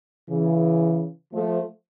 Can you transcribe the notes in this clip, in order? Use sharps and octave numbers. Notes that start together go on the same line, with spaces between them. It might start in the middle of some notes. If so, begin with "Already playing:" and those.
C#3 E3
F3 A3